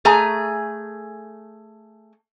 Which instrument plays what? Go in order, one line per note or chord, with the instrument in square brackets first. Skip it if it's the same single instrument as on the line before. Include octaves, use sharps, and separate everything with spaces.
[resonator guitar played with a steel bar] A3 G#4 G#5 A#5